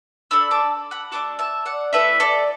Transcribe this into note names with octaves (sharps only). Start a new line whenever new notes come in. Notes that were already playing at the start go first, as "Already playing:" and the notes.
D4 A4 B5 E6
A5 D6
F#5 B5
A3 D4 F#4 A5 D6
E5 A5
D5 F#5
A3 E4 A4 B4 E5
A4 D5